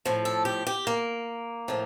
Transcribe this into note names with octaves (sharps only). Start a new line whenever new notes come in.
A2 F3
A4
G4
G4
A#3
A2 F3